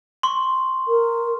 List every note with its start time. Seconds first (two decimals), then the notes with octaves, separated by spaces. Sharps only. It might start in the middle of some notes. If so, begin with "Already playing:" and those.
0.23 C6 C#6
0.88 A#4